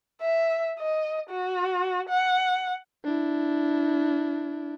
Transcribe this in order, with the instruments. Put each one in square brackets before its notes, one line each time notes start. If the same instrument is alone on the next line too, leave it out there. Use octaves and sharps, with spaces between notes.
[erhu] E5
D#5
F#4
F#5
[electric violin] D4 E4